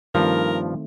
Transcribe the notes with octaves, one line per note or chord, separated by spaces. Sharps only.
G2 D#3 F3 A3 C4 A#4